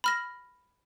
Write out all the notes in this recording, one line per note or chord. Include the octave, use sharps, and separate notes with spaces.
B5 F6 A#6